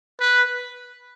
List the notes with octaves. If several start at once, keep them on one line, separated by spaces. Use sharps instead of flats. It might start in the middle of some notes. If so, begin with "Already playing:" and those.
B4